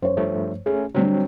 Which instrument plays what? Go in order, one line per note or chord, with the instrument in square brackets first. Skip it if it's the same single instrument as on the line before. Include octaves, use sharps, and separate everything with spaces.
[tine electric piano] F#2 [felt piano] C5 C#5
[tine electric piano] G2 F3 A3
[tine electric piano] A3 C#4 [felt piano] G#4
[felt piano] D3 G3 [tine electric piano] F#3 C4